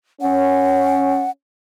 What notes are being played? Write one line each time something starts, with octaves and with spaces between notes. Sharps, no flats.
C#4 F#5